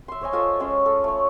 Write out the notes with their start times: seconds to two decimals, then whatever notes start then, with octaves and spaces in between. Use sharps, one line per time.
0.08 E5 C6
0.21 C5 C#5 D#5 G#5
0.33 F4 A4 D#5 E5
0.60 G#3 C#4 G#4
0.86 A4
1.04 A3 C#5